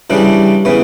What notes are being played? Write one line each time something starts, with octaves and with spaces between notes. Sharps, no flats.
C#3 E3 G3 D4
C#3 E3 B3